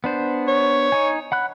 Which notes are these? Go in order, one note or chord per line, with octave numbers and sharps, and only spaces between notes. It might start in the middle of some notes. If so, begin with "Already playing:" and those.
B3 D4 C5
C#5
D#4 G#5
F#5 B5 F#6